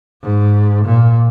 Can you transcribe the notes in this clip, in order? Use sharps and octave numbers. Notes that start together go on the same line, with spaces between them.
G#2
A#2